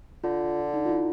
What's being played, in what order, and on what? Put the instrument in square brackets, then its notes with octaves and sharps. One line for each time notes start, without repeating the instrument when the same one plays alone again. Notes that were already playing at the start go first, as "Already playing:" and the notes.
[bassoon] D3 [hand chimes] F4
[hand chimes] D#4
F4
E4